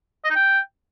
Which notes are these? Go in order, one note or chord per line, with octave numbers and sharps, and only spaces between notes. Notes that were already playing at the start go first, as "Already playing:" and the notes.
D#5
D#4
G5